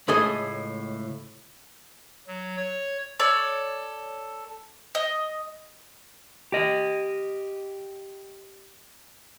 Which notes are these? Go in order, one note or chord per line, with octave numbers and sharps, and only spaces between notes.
C#2 A2 G#4 A4 D#5
F#3
C#5
A4 C#5 D5
D#5
G4 D#5